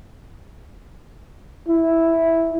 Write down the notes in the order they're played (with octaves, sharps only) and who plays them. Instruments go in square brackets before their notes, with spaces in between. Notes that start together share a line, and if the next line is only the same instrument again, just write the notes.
[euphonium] E4